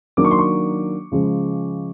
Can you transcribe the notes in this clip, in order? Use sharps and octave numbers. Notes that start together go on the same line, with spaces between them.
D#3 F#3 A#3 D4 D6
C#6
C6
C#6
C#3 F3 G#3